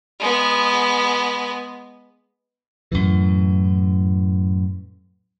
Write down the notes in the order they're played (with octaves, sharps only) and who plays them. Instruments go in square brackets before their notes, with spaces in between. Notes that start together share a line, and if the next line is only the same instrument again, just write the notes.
[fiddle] G#3 B3
[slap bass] F#2 A2 E3